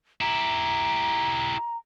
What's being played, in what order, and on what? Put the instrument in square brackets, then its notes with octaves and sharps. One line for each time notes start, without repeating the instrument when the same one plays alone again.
[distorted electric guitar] E4 G4 [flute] A#5